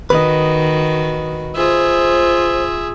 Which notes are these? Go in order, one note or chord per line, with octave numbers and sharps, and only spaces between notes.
D#3 F#4 B4 D#5
F4 G#4 C5 E5